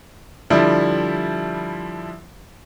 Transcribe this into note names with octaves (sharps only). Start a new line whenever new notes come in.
D3 F3 G3 D4 E4